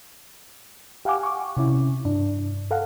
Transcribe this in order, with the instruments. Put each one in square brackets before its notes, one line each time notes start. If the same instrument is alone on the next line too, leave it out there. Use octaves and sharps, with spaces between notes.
[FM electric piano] G4 F5 F#5 G#5 D6
C#6 D6
C3 C#4 E4
G2 D4
A4 F5 F#5